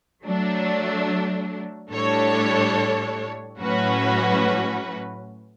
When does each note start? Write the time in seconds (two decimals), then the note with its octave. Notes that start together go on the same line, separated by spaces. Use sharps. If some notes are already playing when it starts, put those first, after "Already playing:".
0.25 F#3 A3 D4
1.92 A2 G3 D4 A4 C#5
3.59 A2 F#3 C#4 F#4 B4